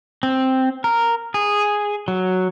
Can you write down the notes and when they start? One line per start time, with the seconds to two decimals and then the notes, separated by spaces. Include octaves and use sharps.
0.23 C4
0.84 A#4
1.34 G#4
2.08 F#3